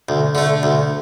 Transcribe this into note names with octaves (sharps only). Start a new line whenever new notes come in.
D2
D3 A3
D2